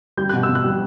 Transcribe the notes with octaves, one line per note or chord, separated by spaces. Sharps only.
G3 G6
B2 F#6
E6
B2
F#6
G3